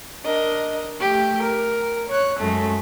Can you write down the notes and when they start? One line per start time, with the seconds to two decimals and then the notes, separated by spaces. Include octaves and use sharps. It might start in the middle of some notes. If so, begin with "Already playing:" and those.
0.25 D4 A#4 D#5
0.99 A3 G4
1.41 A#4
2.08 C#5 F#6
2.39 F#2 G#3 A3